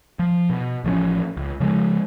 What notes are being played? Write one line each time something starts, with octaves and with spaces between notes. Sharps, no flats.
F3
B2
A1 F3 G#3 C#4
C#2
C#3 F3 G#3